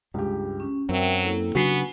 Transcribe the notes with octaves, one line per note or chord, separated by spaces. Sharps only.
C#2 G2 G4
C#4
F#2 F#3 C4 A#4 E5 G5
A#3 E4 A4
C#3 F#3 B3 D4 F#4 G#5 C7